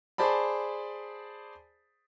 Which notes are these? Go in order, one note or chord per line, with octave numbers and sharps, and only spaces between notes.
G#4 C5 D5 A5 B5